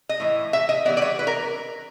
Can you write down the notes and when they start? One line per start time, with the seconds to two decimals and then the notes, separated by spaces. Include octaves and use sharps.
0.09 D#5
0.20 A2 E3
0.53 E5
0.69 D#5
0.85 E3 G3 B3 D5
0.97 D5
1.02 C#5
1.19 B4
1.27 A#4